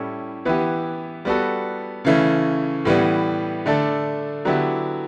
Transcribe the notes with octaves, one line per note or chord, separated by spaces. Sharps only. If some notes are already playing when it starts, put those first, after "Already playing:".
Already playing: A2 G3 C#4 E4 A4
E3 B3 E4 G4
G3 B3 F#4 A4
C#3 E3 A3 C#4
A2 E3 G3 B3
D3 A3 D4 A4
D3 F#3 B3 E4 G4